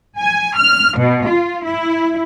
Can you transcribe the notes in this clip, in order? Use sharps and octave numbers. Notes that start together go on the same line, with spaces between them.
G#5
F6
B2
F4
E4